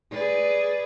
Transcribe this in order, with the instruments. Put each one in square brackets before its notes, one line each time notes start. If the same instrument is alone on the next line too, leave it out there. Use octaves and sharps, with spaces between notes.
[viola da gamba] G#4 B4 D5